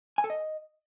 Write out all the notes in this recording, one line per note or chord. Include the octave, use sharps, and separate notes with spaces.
G#5
A4
D#5